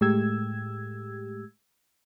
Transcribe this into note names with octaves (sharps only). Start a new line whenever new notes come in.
A2 G#3 A3 G4 E6 G#6